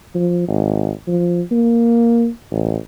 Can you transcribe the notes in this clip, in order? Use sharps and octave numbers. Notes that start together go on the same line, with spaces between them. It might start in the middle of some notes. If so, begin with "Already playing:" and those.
F3
G#1
F3
A#3
A1